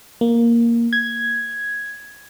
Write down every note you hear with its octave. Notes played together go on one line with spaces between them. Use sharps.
A#3
G#6